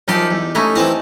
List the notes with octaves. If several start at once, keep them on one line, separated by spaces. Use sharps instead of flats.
F#2 F3 D#4 G4 A4 C6
E2
A3 C#4 D#4 E4
E3 C4 E4 A5 A#5